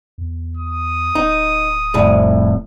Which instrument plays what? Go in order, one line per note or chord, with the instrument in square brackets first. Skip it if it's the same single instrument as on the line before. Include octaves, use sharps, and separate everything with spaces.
[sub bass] E2
[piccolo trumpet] D#6
[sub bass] D1 [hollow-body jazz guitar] D#4
[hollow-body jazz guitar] C2 F2 A2